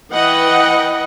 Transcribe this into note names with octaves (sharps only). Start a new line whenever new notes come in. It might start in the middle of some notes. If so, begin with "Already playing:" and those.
E3 B4 D#5 F#5 G5